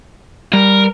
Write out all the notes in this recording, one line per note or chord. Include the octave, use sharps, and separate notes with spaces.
G3 A#4